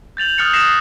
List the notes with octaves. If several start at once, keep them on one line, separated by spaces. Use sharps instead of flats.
G6 A6 F7 F#7
D#6 F6 F#6 A6 C#7
D#6 F#6 A#6 C7 E7